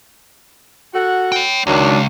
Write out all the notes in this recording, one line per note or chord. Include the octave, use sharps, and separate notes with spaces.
F#4 A4 F#5
C#5 G5
C#2 D#3 F#3 D4